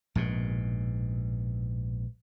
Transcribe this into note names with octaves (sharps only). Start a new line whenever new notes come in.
A#1 G#2 B2